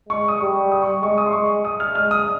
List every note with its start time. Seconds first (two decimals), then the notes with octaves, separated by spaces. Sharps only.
0.09 G#3 C#6
0.28 D#6
0.40 G3 C#6
0.72 D#6
0.82 C#6
1.02 G#3 C#6
1.18 D#6
1.26 C6
1.33 G#3 C#6
1.65 D#6
1.80 F6
1.95 G#3 F6
2.11 D#6